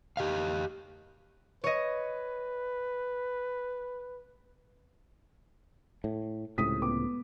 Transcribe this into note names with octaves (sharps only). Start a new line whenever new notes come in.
G4 D#5 F5
B4 C#5 D#5
A2
C#2 A2 C3 D#6 B6
B3 D6